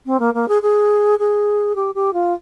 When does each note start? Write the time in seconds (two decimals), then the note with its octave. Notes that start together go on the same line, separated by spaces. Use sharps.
0.06 C4
0.20 A#3
0.34 A#3
0.48 G#4
0.62 G#4
1.19 G#4
1.76 G4
1.95 G4
2.13 F4